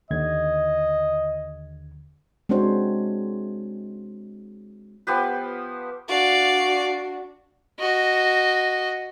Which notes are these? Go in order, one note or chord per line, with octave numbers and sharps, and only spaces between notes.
D#2 D3 D#5 G#6
G#3 C4 D4 F#4 C5 C#5
F3 B3 G4 B4
D4 F#4 D5 F5
F#4 D#5